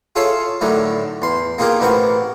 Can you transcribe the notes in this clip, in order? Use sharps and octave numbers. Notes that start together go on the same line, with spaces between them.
F4 G#4 A4 C#5 E5 F5
A2 D3 D#3 F#3 A3
E2 C6
A#3 D#4 F4 G4 G#4 A#4
A1 B3 C4 A#4 F#5 C#6